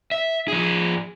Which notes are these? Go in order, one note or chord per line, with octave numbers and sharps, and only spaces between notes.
E5
F3 G#4